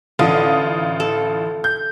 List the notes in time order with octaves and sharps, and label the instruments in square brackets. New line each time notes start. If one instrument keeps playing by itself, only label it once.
[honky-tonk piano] A1 F4 D#6 [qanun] D3
[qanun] A4
[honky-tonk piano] G6